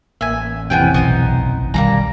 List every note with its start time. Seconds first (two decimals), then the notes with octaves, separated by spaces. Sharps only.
0.21 A1 A#3 E5 G#5
0.70 F2 C3 E3 B3 C#4 G5
0.94 B1 B3 D#4 C5
1.74 B1 D#3 G3 A#3 C#4 A#5